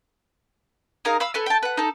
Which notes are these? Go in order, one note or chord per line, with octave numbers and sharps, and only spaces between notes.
D#4 G#4 A#4 F5
F5 B5 E6
A4 B4 G#5
G5 A5
B4 F#5
D#4 A4